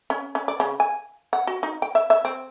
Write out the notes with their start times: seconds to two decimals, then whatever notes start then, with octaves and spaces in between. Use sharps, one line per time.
0.10 C#4
0.35 C#4
0.48 D5
0.60 C#3
0.80 G#5
1.33 F#5
1.47 F#4
1.63 D#4
1.82 G5
1.95 E5
2.10 E5
2.25 C4